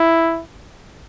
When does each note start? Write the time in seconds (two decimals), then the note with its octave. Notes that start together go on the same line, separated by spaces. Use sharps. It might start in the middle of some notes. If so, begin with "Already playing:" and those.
Already playing: E4